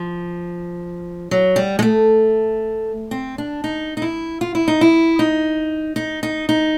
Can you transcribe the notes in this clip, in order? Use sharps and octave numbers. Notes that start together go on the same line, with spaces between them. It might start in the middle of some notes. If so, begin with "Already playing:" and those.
Already playing: F3
F#3
G3
G#3
A3
C4
D4
D#4
D#4
E4
F4
E4
D#4
E4
D#4
D#4
D#4
D#4